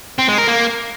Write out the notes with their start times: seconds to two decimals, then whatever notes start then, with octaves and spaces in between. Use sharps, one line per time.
0.19 C4
0.28 G#3
0.38 A#4
0.48 A#3